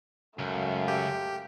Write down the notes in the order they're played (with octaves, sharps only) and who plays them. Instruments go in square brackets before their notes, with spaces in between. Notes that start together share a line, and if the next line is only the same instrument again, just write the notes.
[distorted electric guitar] C#2 [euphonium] F#2 [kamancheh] A3 F5
[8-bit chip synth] G4